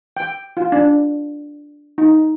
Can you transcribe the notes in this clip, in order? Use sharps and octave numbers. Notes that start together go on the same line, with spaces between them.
G5
F4
D4
D#4